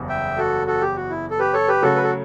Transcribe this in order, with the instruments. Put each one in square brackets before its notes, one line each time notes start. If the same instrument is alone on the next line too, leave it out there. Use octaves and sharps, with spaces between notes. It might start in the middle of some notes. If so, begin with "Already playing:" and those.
Already playing: [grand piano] F#1 E2 C#3 G3
[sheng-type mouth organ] E5 G5
F#4 A4
F#4 A4
G4
F#4
E4
A4
G4 B4
A4 C#5
G4 B4
[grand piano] C#3 F#3 A3 [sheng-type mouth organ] F#4 A4
[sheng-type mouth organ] B4
A4